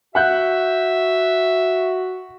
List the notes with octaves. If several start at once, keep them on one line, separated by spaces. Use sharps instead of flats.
F#4 E5 F#5 F#6 G6